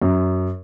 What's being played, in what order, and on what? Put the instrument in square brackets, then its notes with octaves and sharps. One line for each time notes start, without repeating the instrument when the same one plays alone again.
[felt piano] F#2